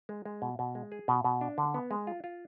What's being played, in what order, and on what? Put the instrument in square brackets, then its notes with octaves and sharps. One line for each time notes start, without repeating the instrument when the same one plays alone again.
[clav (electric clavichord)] G#3
G#3
B2
B2
G#3
G#4
B2
B2
D4
D3
B3
G#3
F4
F4